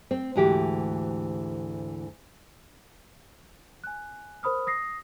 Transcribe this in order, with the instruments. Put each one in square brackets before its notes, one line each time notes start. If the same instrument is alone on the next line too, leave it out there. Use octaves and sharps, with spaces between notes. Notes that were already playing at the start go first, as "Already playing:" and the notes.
[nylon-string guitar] C4
D2 G#2 E3 F#4 G4
[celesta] G#5 F#6
A#4 C5 B5 D#6 F6
D#6 A#6 C7